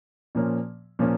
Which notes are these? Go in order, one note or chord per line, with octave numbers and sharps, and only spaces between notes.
A#2 F3 A#3 C#4
A#2 F3 A#3 C#4